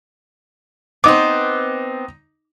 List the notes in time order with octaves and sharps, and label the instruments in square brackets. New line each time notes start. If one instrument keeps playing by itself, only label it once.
[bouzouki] B3 C4 [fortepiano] D#4 D6